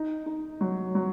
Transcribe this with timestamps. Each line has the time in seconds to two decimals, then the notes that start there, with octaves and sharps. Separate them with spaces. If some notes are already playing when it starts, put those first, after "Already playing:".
Already playing: D#4
0.26 D#4
0.61 F#3
0.95 F#3